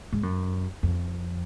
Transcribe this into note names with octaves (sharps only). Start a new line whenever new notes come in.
G#2
F#2
F2